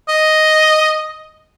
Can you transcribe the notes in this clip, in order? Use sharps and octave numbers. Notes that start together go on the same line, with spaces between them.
D#5